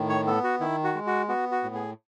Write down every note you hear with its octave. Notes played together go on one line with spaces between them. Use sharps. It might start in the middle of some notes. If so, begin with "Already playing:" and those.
Already playing: A2 D#3
C#5
B3 A4
F#4
D#3 E4
F#4
G#3
F#4
B3 F#4
F#4
A2
G#4